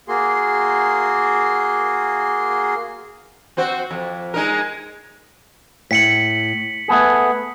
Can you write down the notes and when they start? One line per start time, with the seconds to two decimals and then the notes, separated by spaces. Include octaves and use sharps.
0.08 A#3 F#4 G#4 C6
3.57 C4 F#4 C5
3.91 F2
4.34 G#3 D#4 A#4
5.91 A2 B6 C#7 F#7
6.88 A3 B3 G#4